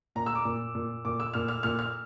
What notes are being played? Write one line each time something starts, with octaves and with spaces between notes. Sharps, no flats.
A#2 A#5
E6
D6
A#2
A#2
A#2 D6
E6
A#2 F6
F6
A#2 F6
F6